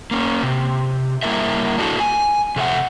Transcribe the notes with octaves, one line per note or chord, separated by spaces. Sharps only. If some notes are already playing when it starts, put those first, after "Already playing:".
A#3 C#4
C3
G3 A#3 E4 A#4 E5
D4 E4 F#4 A4
G#5
C3 A4 E5 F#5